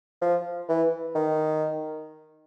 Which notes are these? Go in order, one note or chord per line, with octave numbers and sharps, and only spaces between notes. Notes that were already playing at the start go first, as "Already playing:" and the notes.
F3
E3
D#3